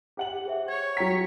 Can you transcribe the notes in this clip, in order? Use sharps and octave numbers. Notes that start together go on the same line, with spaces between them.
G4 F#5 F#7
G#4 C5 E5
C#5 G#6
F#3 F#5 G5 A#5 B6